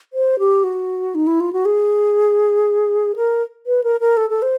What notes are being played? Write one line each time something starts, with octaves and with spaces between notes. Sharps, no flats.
C5
G4
F#4
D#4
E4
F4
F#4
G#4
A#4
B4
A#4
A#4
A4
A4
C5